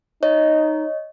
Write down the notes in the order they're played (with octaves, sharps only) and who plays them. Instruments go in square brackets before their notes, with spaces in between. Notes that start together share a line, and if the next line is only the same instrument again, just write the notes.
[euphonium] D#4 [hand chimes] C#5 D#5